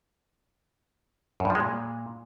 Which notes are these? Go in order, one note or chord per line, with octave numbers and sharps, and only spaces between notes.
F#2
G2
F3
G#3
A#2